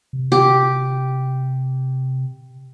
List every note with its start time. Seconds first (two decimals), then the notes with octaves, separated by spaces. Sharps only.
0.13 C3
0.32 G4